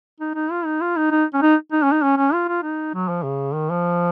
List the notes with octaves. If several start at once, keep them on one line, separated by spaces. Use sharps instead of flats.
D#4
D#4
F4
D#4
F4
D#4
D#4
C#4
D#4
D#4
C#4
D#4
C#4
C#4
F4
F4
D#4
F#3
F3
C#3
D#3
F3